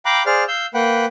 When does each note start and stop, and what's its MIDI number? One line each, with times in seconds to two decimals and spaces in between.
0.06 0.23 77
0.06 0.23 79
0.06 0.23 82
0.06 0.23 83
0.06 0.23 86
0.06 0.23 90
0.26 0.44 68
0.26 0.44 72
0.26 0.44 74
0.26 0.44 77
0.26 0.44 89
0.48 0.66 77
0.48 0.66 88
0.48 0.66 91
0.74 1.05 58
0.74 1.05 71
0.74 1.05 78
0.74 1.05 79